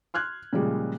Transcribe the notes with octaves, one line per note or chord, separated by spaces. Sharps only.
C6 F6 F#6 G#6
A#2 C#3 F3 G3 G#3